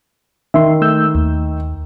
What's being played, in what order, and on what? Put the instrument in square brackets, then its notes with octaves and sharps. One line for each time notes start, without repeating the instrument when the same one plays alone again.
[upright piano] D#3 [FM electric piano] E5 C6
[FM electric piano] A3 E6 G6
D#2